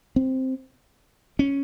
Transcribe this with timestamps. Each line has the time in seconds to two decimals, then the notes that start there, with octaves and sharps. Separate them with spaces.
0.16 C4
1.39 C#4